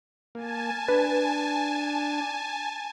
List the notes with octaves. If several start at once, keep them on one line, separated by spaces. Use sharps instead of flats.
A#3 G#5 A5
D4 B4